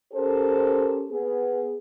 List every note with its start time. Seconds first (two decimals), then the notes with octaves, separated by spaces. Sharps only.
0.13 C#4 G4 A4 A#4 C5
1.11 B3 G#4